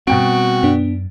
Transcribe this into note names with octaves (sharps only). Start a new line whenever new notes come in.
B2 G3 B3 C4 F#4 G5 D7
F#2 B3 D4